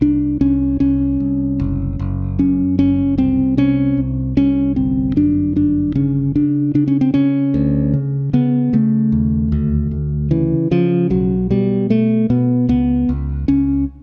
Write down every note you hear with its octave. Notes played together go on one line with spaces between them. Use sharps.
C2 D4
C2 C#4
C2 C#4
C2
F#1
F#1
F#2 C#4
F#1 C#4
C2 C4
C3 C#4
C2
C2 C#4
G1 C4
F#2 D4
G1 D4
C#3 C#4
C#3 D4
C#3 D4
C#4
C4
C#3 C#4
D2
C#3
C#3 B3
C#3 A3
D#2
D2
D2
C#3 E3
C#3 F3
B1 F#3
B2 G3
B2 A3
B2 B3
C#2 B3
C#2
C#2 C#4